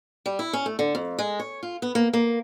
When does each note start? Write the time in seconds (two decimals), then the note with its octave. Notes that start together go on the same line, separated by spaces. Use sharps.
0.26 G3
0.39 E4
0.53 C#4
0.66 A3
0.79 D3
0.95 F2
1.19 G#3
1.40 C#5
1.63 F4
1.82 B3
1.95 A#3
2.13 A#3